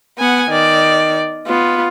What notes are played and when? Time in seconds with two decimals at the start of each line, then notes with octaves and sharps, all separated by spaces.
0.19 B3 F#5 G#5
0.50 D#3 D5
1.47 B3 F4